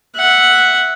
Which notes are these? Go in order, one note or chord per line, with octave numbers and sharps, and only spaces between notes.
E5 F#5